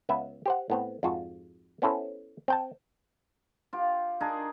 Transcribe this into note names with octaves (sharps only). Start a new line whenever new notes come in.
C#2 B3 B4 E5
G4 C5 F#5
A2 B3 C4
F2 G#2 F4 F#4
B3 C#4 E4 A4 C5
C4 G5 A5
F4 G4
D4 D#4 G#4 A#4